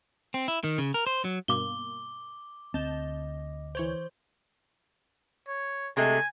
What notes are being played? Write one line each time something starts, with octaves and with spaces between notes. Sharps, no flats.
C4
E4
D#3
C#3
A#4
C5
F#3
G2 B2 A#3 D6 G7
D2 C4 D#5 A5 G6
E3 C5 C#5 G6
C#5
C3 G#3 A3 G#5